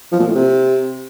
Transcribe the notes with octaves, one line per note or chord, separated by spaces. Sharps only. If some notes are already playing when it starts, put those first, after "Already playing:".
F3
A#2
A2
C3